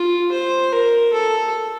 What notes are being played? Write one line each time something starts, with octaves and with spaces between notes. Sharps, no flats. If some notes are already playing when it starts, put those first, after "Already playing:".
Already playing: F4
C5
A#4
A4